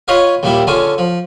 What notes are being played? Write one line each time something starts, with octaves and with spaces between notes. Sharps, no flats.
F4 B4 C#5 D#5 F5
D#2 A#2 G3 E4
D3 C#4 F4 G#4
F3